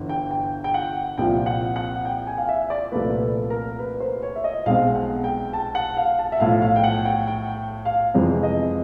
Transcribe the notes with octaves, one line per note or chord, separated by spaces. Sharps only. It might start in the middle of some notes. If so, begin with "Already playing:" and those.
Already playing: G1 E3
G5
G5
G5
F#5
C2 A#2 F3 G5
F#5
F#5
G5
G#5
F5
E5
D5
C2 A#2 F3 A3 B4
A4
A#4
B4
C5
C#5
E5
D#5
B1 B2 G#3 C4 F5
F#5
G5
A5
F#5
F5
A5
E5
B1 A2 F3 F5
F5
G5
F#5
G5
G5
F5
F2 C3 E3 G#3
D#5